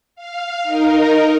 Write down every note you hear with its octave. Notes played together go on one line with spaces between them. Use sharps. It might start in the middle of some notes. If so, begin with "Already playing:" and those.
F5
D#4 A#4